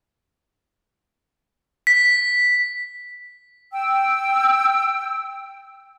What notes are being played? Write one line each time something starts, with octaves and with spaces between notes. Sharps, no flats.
B6
G5 E6